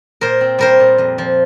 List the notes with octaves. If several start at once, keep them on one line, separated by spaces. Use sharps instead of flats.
A#2 A#4 C5
C4
G3 A#4 C5
A#2
F2
F3